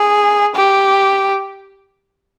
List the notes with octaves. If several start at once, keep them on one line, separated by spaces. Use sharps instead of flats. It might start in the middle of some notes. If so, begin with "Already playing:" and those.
Already playing: G#4
G4